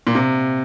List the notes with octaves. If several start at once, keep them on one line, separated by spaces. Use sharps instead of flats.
A#2
C3